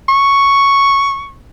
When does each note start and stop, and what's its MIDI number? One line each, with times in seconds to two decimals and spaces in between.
0.09 1.33 85